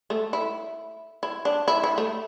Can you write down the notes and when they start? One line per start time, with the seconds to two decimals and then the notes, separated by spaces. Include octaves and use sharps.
0.10 A3
0.33 E4
1.23 E4
1.45 D4
1.68 E4
1.84 E4
1.98 A3